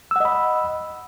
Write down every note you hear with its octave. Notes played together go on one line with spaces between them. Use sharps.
D#5 F#5 B5 E6